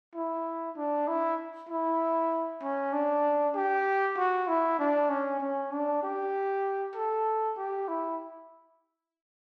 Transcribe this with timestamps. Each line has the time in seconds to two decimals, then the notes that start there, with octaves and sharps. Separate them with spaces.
0.15 E4
0.77 D4
1.08 E4
1.70 E4
2.62 C#4
2.93 D4
3.55 G4
4.17 F#4
4.48 E4
4.79 D4
5.10 C#4
5.41 C#4
5.71 D4
6.03 G4
6.96 A4
7.57 G4
7.88 E4